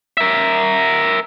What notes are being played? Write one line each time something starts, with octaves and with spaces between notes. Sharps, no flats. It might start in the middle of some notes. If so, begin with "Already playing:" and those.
A#4 E5